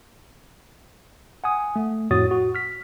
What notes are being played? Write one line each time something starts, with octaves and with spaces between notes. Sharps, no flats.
F#5 G#5 D#6
A3
F2 A2 F#4 C#5 D#6 A6
F#4
F6 B6